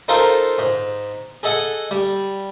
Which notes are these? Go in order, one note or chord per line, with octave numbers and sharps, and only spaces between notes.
D#4 F4 A4 A#4 C5
G#2
G#4 A4 D#5 F#5
G3